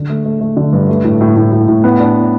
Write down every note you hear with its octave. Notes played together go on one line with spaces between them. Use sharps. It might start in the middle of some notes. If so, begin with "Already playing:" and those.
Already playing: D3
A3
A3
A3
D3
G2
A3
A2
A2
A2
A2
A2
B3
D4